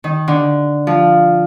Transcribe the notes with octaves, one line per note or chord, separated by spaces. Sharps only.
D#3
D3
F3